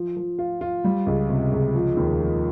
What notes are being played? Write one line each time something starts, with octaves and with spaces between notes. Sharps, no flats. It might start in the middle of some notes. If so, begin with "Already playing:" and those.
Already playing: F3
F3
F4
F4
G3
C#2
C3
C#2
F3
D#2
F3